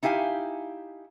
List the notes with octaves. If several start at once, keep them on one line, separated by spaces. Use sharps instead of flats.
D#4 E4 G4 F5 G#5